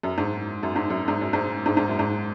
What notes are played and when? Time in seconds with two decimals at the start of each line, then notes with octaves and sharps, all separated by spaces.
0.03 F#2
0.18 G#2
0.63 F#2
0.76 G#2
0.90 F#2
1.08 G#2
1.21 F#2
1.33 G#2
1.66 G#2
1.77 G#2
1.88 F#2
1.99 G#2